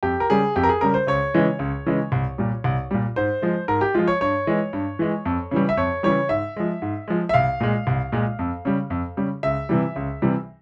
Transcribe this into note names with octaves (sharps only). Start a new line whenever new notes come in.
F2 G4
A#4
C#3 G3 G#4
F2 G4
A#4
G#4
C#3 G3 A#4
C5
C#2 C#5
C#3 E3 G#3
C#2
C#3 E3 G#3
C2
A#2 G3
C2
A#2 G3
G#2 C5
F3 G#3
G#2 A#4
G4
F3 G#3 F4
C#5
G2 C#5
E3 G#3
G2
E3 G#3
F2
C#3 E3 G3
E5
F2 C#5
C#3 E3 G3 C#5
G#2 E5
F3 G#3
G#2
F3 G#3
E5
C2 F5
A#2 G#3
C2
A#2 G#3
F2
C#3 G3
F2
C#3 G3
C#2 E5
C3 E3 G3
C#2
C3 E3 G3